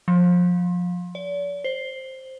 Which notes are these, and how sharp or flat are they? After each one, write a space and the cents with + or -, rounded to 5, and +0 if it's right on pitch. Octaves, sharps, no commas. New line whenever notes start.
F3 +25
D5 -40
C5 +5